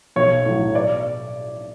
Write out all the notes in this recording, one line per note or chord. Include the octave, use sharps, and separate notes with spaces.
B1 C#5
A2 F#3
D5